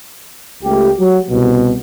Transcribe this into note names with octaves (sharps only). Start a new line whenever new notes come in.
C#2 A3 G4
F#3
C2 B2